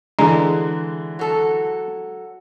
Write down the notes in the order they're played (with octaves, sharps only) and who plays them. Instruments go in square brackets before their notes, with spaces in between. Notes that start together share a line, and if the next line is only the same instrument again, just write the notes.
[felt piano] D3 E3 [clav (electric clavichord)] G#3 [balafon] G#4 A#5
[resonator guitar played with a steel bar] F#3 A4